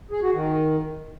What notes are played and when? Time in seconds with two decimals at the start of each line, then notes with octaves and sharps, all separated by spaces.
0.11 G#4
0.22 F#4
0.33 D#3